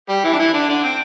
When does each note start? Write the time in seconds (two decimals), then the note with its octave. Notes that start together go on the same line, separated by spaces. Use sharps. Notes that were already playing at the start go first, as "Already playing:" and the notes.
0.09 G3 G4
0.24 E3 E4
0.33 D4
0.38 E3 E4
0.53 D3 D4
0.69 D3 D4
0.83 C4